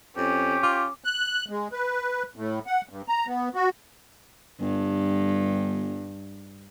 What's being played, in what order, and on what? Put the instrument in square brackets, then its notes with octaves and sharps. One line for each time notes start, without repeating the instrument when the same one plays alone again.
[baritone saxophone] F2 [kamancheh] C#4 [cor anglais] G4
[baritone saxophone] F4 [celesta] D6
[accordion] F#6
G#3
B4
A2
F#5
G2
A#5
B3
F#4
[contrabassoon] G1 [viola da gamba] G2